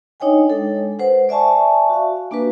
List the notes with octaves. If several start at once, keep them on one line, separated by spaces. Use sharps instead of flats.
D4 D#4 C#5 D#5 G5 G#5
G#3 A4
B4 C5 F#5
D5 E5 G#5 A5 C#6
F#4 F5
A#3 D4 F#4 G4 B4